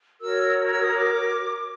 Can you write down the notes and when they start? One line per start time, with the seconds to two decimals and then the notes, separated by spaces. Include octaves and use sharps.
0.20 F#4 A#4 C#5 E6
0.68 E6
0.82 D#6
0.94 D6